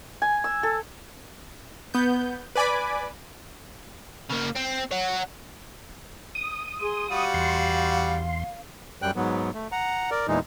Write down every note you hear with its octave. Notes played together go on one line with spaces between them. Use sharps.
G#5
E6
A4
B3 G6
B4 D5 G#5 B5 D6
C#3 A#3
C4
C#5 F#5
D#6
G#4 C6
G3 F#4 F5 F#5
E2 C6
F#2 G3 G5 F#6
G#2 F#3 B3
A3
F#5 A#5
A#4 D5
E2 A#2 E3 G#3 D#4